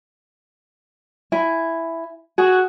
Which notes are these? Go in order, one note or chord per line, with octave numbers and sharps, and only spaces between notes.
E4 G#5
F#4 G#4